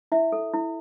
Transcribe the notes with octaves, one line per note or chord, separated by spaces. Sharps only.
E4 E5
A4
E4